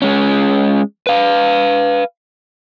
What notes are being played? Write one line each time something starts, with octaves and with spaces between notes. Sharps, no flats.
G#3 C#4
B4 F5